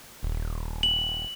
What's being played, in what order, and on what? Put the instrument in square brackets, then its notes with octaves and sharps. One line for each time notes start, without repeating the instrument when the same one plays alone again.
[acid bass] D#1
[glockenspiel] F#7